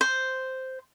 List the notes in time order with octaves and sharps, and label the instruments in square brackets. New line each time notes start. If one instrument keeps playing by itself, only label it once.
[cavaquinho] C5